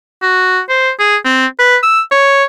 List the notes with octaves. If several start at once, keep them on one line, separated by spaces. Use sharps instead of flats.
F#4
C5
G#4
C4
B4
E6
C#5